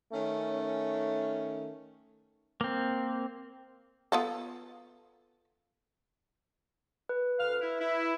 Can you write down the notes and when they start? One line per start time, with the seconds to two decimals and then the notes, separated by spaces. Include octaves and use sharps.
0.12 D#3 A3 C#4
2.61 A#3 C4
4.12 B3 F4 A4
7.09 B4
7.39 D2 F5 F6
7.61 E4
7.80 E4